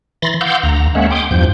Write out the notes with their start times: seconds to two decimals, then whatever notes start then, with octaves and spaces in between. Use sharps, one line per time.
0.22 E3 B5 C6 A6 A#6
0.41 F5 F#5 C6 D6 E6 G6
0.63 D2 A#5
0.95 G#3 A#3 C#4 E5 F#5
1.11 G5 C6 D6 D#6
1.31 E2 G2 F3 G6